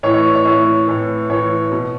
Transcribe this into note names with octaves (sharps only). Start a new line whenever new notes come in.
A2 E3 C#5
C#5
D5
C#5
A2 E3 C#5
A2 E3
A2 E3 C#5
B2